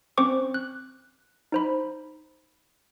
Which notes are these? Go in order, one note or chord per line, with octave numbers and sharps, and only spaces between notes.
C4 C#4 C5 C#6 D6
F#6
D#4 C5 B5